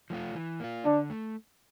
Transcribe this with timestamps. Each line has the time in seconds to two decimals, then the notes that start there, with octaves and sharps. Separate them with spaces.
0.10 F3 A3 D4 F4
0.35 E3
0.60 A#3 F4
0.85 D3 D4
1.10 A3